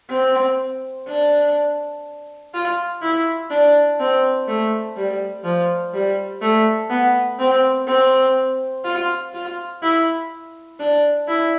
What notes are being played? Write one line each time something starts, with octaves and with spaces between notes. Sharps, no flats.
C4
D4
F4
E4
D4
C4
A3
G3
F3
G3
A3
B3
C4
C4
F4
F4
E4
D4
E4